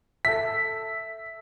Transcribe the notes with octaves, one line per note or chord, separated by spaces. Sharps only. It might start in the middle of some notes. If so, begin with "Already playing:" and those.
A4 E5 B6